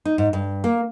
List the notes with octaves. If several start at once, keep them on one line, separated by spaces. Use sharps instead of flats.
D#4
G#2
G2
A#3